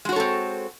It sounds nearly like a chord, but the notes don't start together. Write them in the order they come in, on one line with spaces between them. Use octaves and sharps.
G#3 F#4 C#5 A4 C4